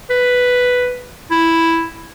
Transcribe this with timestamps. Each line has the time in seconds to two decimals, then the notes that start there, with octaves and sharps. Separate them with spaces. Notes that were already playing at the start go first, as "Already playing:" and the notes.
0.10 B4
1.31 E4